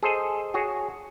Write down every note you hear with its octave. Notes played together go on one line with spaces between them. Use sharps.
G#4 A4 C5 D#5
F#4 G#4 C#5